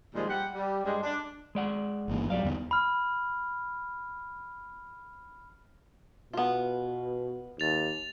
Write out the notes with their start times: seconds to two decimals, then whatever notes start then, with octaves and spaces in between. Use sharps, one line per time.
0.14 A#2 D#3 F3 G3 G#3
0.28 G3 G4 F#5
0.54 G3
0.84 G2 G3 G#3
1.02 D4
1.55 G#3 D5 F#5
2.08 G1 E3 A#3
2.30 C2 F#3 G3 D5 F5
2.44 E2 D3 B3
2.71 B5 F6
6.33 B2 B3 F4
7.60 D#2 A6 F7